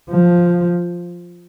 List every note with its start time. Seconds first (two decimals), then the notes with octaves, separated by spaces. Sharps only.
0.10 F3